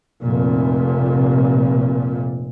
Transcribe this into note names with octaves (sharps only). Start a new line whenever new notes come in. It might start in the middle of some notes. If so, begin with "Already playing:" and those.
F1 A#2